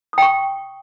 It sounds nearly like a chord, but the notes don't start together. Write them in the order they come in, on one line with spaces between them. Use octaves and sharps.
D#6 G5 C#6